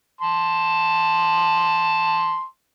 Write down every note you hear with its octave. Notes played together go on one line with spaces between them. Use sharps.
A5 C6